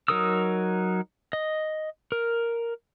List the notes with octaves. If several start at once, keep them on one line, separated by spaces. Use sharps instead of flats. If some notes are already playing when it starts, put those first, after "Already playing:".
F#3 D#4 A#4 D#6 E6
D#5
A#4